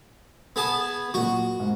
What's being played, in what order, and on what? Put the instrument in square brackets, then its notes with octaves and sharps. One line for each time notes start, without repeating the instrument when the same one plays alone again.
[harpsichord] B3 G#4 A5
[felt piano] A#2 F#3 [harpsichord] F#4
[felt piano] G#2